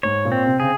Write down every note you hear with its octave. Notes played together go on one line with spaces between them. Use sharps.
G#2 C#5
A#2
C4
C3
C#3 G#4